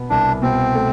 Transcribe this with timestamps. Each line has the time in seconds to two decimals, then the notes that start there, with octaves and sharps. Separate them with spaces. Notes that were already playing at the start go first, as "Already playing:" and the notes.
Already playing: B2 B3
0.10 C2 D4
0.42 B2 C4
0.75 A3